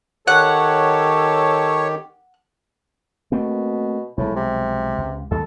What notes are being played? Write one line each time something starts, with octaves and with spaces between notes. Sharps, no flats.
D#3 G4 A4 C#5 F#5
B2 A3 A#3 C4
B1 A2 F3 G#3
C3
C#2
D#2 G#2 G3 A4